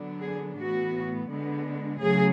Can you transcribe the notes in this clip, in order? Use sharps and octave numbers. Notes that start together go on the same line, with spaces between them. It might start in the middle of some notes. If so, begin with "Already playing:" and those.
Already playing: D3 F#3 B3 D4
G#4
A2 E3 B3 F#4
D3 G#3 B3 D4
C#3 F#3 A3 G#4